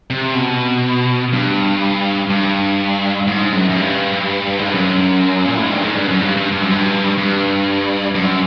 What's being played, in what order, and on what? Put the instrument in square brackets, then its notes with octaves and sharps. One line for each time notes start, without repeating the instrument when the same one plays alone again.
[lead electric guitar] C3
B2
G2
G2
G#2
F#2
F#2
G2
G#2
G2
F#2
A#2
A2
G#2
G2
G#2
G2
F#2
G2
G2
G2
F#2
G2
G2
F#2